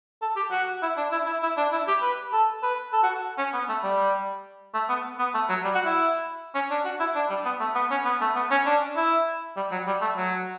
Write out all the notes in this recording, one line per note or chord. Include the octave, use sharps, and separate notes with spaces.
A4
G4
F#4
E4
D4
E4
E4
E4
D4
E4
G4
B4
A4
B4
A4
F#4
C#4
B3
A3
G3
A3
B3
B3
A3
F#3
G3
F#4
E4
C#4
D4
F#4
E4
D4
G3
B3
A3
B3
C#4
B3
A3
B3
C#4
D4
E4
G3
F#3
G3
A3
F#3